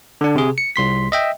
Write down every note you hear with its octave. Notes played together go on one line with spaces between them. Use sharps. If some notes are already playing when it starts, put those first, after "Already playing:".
D3 D4
C3 G#4
C#7
C2 C6 B6
D#5 E5 G5